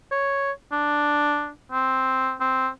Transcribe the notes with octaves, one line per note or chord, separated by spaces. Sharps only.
C#5
D4
C4
C4